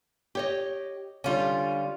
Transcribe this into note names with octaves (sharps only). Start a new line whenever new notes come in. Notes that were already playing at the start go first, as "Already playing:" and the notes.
G4 C#5 D#5
D3 G3 C#4 F4